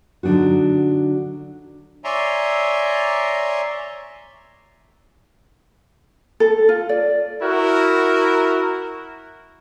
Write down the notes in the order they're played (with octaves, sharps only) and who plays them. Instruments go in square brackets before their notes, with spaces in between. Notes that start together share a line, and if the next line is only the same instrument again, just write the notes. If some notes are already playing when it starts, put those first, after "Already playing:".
[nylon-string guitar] D3 F#3 D4 D#4 F#4
[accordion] C#5 D5 E5 G#5 A#5 C6
[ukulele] A4
F4
D5
[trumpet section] E4 F#4 A#4